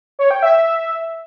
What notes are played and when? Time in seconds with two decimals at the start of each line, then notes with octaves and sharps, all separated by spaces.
0.19 C#5
0.31 G5
0.42 E5